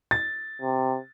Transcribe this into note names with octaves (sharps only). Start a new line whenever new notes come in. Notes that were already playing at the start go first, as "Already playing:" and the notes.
A6
C3